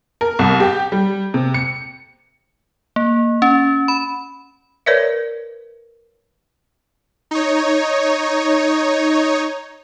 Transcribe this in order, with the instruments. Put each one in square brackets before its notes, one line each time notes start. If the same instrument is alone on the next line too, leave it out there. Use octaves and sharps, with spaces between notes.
[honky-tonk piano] A#4
C2
G4
G3
C3
C#7
[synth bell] A#3
C#4
B5
[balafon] A#4 B4 C#5 D5 E5
[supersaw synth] D#4 C#5